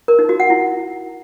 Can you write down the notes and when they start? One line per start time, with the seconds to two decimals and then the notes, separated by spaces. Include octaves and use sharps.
0.08 A#4
0.19 D#4
0.29 F#4
0.40 F#5
0.50 E4